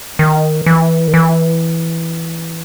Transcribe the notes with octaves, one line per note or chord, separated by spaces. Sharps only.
D#3
E3
D#3
E3